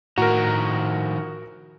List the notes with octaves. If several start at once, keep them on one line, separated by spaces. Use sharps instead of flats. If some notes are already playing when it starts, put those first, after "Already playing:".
A2 D#3 F3 F#4 A#4 A#5